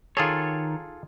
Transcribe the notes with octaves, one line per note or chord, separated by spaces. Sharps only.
D#3 F4 G#4 A4 C#5